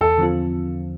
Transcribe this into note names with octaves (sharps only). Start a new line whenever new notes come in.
E2 A4
D3 F3 C4 F4